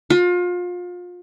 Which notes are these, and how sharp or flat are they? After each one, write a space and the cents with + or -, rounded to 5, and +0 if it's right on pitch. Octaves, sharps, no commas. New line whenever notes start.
F4 +30